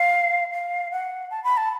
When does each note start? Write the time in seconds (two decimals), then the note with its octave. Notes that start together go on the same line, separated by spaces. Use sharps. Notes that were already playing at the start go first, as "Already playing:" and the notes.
Already playing: F5
0.53 F5
0.91 F#5
1.31 A5
1.44 B5
1.57 A5